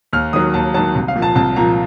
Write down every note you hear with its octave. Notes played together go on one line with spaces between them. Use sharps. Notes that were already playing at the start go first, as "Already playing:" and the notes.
D#2 F6
D#3 F#3 D#6
D#2 A5
D#3 F#3 A5
C2
F5
A#2 F3
A5
C2 A5
A#2 F3 A#5